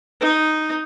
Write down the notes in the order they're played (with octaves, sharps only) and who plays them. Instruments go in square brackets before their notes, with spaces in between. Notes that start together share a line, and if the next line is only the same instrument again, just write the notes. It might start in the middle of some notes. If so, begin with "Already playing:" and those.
[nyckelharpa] D#4